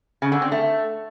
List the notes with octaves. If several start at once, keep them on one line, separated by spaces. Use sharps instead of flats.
C#3
D3
C4
A3